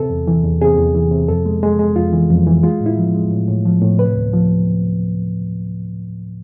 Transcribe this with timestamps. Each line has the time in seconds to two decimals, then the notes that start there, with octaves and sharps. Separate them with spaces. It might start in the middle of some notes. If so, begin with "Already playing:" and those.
Already playing: C3 A4
0.10 E2
0.27 E3
0.44 E2
0.61 C3 G#4
0.78 E2
0.95 E3
1.12 C3
1.29 F2 A4
1.46 G#3
1.63 G#3
1.79 G#3
1.96 F2 F4
2.13 E3
2.30 F2
2.47 E3
2.63 G#3 F4
2.81 A2
2.86 E4
2.97 F3
3.14 G#3
3.31 A2
3.48 A2
3.65 F3
3.81 A2
3.99 C3 B4
4.16 D2
4.33 F3